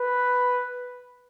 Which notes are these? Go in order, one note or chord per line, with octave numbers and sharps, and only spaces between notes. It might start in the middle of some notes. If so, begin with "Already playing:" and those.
Already playing: B4